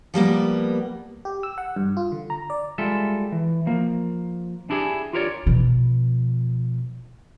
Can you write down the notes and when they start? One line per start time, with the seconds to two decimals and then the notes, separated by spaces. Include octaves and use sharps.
0.14 F3 G3 A#3 B3
1.25 G4
1.43 E6
1.58 F#5
1.76 G2
1.97 F4
2.12 D3
2.30 A#5
2.50 D5
2.78 G3 G#3 F4 A4 E5
3.32 E3
3.66 F3 A#3
4.70 D4 E4 G4 G#4
5.13 F4 G4 A#4 B4 C#5 D5
5.46 B2 F3